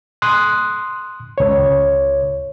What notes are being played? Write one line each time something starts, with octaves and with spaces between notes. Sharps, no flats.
C6 D#6 F#6
C#2 C#5